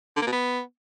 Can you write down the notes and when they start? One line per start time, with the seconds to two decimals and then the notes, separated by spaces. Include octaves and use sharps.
0.16 D3
0.22 A#3
0.27 B2
0.32 B3